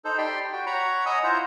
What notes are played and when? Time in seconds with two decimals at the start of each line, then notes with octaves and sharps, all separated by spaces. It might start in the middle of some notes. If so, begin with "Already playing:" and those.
0.05 D#4 A4 C5
0.18 G4 D5 G5 B5 C6
0.52 F#4 G5
0.66 C#5 F#5 A#5 B5
1.06 D#5 F#5 G#5 A#5 D#6 E6
1.24 E4 F4 C5 E5 F#5 A#5